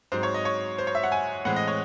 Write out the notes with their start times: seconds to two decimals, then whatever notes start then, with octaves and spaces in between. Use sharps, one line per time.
0.12 G#2 F#3 C4 C5
0.23 C#5
0.34 D#5
0.45 C#5
0.78 C5
0.87 C#5
0.95 E5
1.04 F#5
1.12 G#5
1.45 A2 E3 G#3 C4 F#5
1.56 D#5
1.67 C#5